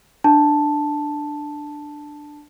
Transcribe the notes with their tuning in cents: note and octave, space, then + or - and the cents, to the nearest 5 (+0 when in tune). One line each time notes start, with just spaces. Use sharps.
D4 +10 A5 +0